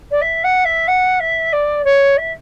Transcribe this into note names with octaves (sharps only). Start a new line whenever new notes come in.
D5
E5
F#5
E5
F#5
E5
D5
C#5
E5